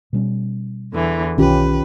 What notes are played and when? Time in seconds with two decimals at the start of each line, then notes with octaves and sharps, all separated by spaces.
0.13 B2 G3 C#4
0.93 E2 D3 E3
1.38 B1 D#3 C#4 F4 G4 B4